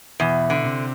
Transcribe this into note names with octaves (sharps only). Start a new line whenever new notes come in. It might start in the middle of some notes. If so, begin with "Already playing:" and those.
E2 B2
D3
C3